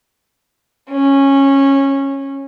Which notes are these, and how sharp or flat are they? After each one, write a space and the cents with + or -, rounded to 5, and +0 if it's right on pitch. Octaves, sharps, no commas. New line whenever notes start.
C#4 -15